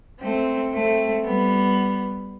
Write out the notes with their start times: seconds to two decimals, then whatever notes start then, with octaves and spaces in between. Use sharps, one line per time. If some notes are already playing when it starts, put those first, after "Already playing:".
0.21 A3 C4
0.73 A3 C4
1.25 G3 B3